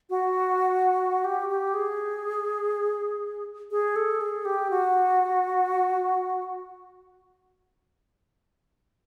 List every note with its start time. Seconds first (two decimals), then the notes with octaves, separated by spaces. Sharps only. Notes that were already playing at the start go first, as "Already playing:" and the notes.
0.10 F#4
1.24 G4
1.49 G4
1.74 G#4
3.71 G#4
3.96 A4
4.21 G#4
4.45 G4
4.70 F#4